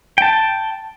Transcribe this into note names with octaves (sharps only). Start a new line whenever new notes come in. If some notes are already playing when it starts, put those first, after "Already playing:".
G5 A5